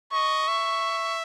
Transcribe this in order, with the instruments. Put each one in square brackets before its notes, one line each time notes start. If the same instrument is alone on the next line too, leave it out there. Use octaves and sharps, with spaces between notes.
[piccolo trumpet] D#5 [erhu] C#6
[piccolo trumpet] E5